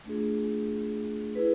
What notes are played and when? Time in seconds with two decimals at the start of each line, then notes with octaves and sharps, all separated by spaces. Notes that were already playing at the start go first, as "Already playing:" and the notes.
0.05 A3 D4 F4 G#4
1.35 E4 G#4 B4